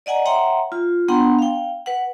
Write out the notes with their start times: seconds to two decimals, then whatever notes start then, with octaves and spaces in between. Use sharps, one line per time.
0.06 D5 D#5 F#5 G#5 A#5
0.26 C#5 E5 F#5 G5 A#5 C6
0.72 F4
1.08 B3 D4 F#5 G5 A#5 C6
1.39 F5 G5
1.86 B4 F#5